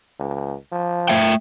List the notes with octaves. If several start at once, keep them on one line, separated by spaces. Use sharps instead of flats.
C#2
F3
A3 E5 G5